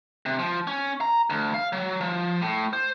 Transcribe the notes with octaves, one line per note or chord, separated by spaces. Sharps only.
C3
F3
C#4
A#5
D2
F5
F#3
F3
A2
C5